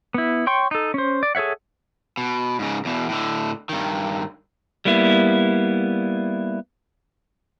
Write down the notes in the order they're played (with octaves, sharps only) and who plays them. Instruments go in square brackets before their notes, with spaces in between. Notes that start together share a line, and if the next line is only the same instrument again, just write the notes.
[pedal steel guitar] B3 E4
C#5 G5 C6 C#6
D#4 A4
C#4 C5
D5
G#4 A4 C#5 E5 F#5
[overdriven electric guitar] B2
G#2 C#3
E2 B2
A2 D3
G2 D#3
[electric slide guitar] G3 A#3 B3 E4